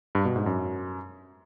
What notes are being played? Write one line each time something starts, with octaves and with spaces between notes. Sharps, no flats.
G2
B2
G#2
F#2